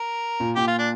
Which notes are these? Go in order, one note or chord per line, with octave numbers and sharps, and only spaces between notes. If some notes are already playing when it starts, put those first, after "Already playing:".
Already playing: A#4
A#2
A#2 G4
F4
D4